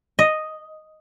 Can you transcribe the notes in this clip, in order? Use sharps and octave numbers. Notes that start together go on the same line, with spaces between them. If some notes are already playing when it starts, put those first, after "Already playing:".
D#5